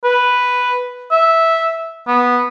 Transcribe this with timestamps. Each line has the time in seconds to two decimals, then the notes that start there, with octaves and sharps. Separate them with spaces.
0.05 B4
1.11 E5
2.08 B3